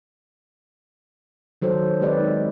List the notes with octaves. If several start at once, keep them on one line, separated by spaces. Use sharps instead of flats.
D#3 F#3 A4 C5
G#3 C4 G4 B4 D5 D#5
D#4